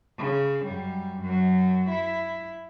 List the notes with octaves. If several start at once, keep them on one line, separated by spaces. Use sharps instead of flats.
C#3
F#2 G3
F#2 F#3
E4